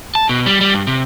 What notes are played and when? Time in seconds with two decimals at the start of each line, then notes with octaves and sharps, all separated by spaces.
0.15 A5
0.29 B2
0.46 G3
0.61 G3
0.74 G2
0.87 C3